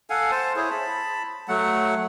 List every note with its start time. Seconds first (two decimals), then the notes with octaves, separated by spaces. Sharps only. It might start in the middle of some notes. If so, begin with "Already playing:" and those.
0.10 A4 F5 F#5 G#5
0.31 C5 A5
0.56 E4 G#4 C5 C#5
0.70 A5 B5
1.48 F#3 A3 F#5